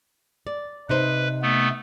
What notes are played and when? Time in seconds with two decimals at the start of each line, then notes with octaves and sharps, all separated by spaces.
0.47 D5
0.89 C3 D#4 B4 C5
1.42 A3 B3